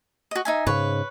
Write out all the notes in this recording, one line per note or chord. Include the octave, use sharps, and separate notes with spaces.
F#4 D#5
D#4 E5 G#5
G#2 C#3 B4 C#5